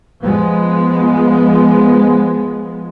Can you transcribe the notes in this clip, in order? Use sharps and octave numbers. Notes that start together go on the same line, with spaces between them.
F3 G#3 B3